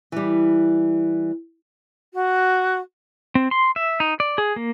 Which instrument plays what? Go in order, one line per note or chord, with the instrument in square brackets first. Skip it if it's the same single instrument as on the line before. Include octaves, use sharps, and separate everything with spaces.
[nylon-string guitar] E3 G3
[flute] F#4
[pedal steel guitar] C4
C6
E5
D#4
D5
G#4
A#3